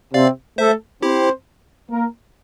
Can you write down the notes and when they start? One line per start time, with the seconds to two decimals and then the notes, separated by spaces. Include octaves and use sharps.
0.14 C3 C4 D5 F5
0.58 A3 A4 C5 E5
1.02 C4 E4 G4 C5
1.91 A#3 A#4